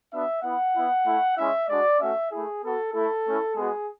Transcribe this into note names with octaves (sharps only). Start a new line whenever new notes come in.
B3 D4 F#4 E5
B3 E4 F#5
B3 E4
A3 E4
G#3 C#4 E4 E5
G#3 D4 F#4 D5
A3 C#4 F#4 E5
A3 E4 G#4
B3 F#4 A4
A3 E4 A4
A3 C#4 E4
G#3 B3 F#4 G#4